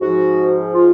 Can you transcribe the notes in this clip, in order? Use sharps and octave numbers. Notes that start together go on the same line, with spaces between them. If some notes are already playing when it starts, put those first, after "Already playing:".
G#2 F3 F#4
F4